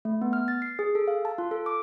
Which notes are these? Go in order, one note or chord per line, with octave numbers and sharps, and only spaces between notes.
A3
B3
F6
A6
C7
G#4
A4
F5
A5
F4
A4
D6